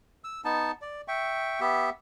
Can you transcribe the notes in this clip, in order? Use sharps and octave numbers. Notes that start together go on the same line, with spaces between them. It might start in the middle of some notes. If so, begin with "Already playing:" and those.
E6
B3 D#4 A5
D5
E5 G5 C#6
B3 G4 E5